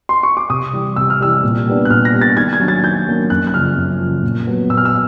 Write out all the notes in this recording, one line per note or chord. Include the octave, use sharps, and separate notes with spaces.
C6
C#6
D6
C3 D#6
E3 G3
C3 E6
F6
E3 G3 E6
A#2
G3 B3 D4
F#6
A#2 F6
A#6
G3 B3 D4
A6
D#3 G#6
G#6
F#3 A#3 D4
A6
D#3 G6
F#3 A#3 D4
F#2 F#6
F#6
C#3 F3 F6
F#2
C#3 F3
A#2
F#3 B3
A#2 E6
F6
E6